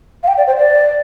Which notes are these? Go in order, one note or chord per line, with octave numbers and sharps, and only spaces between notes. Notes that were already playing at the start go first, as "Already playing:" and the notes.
F5
G5
D5
C5
D5